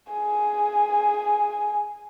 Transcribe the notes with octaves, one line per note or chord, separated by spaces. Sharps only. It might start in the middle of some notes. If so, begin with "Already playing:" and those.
G#4 G#5